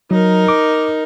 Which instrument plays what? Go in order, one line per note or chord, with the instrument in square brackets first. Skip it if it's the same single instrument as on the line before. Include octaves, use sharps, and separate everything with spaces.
[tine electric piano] F#3 [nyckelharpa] D#4 A#4
[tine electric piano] D6